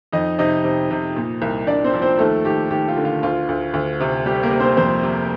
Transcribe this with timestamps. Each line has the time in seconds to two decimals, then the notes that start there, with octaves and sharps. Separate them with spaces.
0.12 F2 D#4 D#5
0.39 C3 D#4 D#5
0.64 C3
0.91 C3
1.16 A#2
1.42 C2
1.67 C2 D4 D5
1.84 C4 C5
1.94 F3
2.02 C4 C5
2.19 D#2 A3 A4
2.45 D#2 G4
2.70 D#2 G4
2.88 F4
2.97 D3
3.05 F4
3.23 D2 F4
3.49 D2
3.74 D2
4.00 C3
4.26 G3 G4
4.43 A#3 A#4
4.52 C3
4.60 C4 C5
4.77 F2 C4 C5
5.03 C3